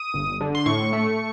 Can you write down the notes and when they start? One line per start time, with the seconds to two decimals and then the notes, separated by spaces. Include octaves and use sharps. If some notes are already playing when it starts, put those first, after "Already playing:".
Already playing: D#6
0.14 G1
0.41 D3
0.55 C6
0.66 A2 C#6
0.93 A3